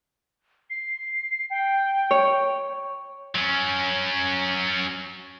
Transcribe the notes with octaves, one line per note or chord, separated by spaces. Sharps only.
C7
G5
C#5
F#3 C#4